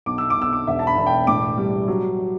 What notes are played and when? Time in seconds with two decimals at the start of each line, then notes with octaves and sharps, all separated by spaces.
0.06 B1 D6
0.18 E6
0.30 D6
0.37 B1 E6
0.53 D6
0.67 E1 E5
0.79 A5
0.87 B5
0.97 E1
1.07 G5
1.27 A2 D6
1.58 G3
1.88 F#3